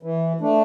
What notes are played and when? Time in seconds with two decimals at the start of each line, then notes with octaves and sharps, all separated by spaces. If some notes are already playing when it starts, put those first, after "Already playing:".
0.03 E3
0.40 A3 D4